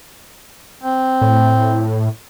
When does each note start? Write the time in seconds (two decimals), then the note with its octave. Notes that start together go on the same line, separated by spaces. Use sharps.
0.83 C4
1.21 A2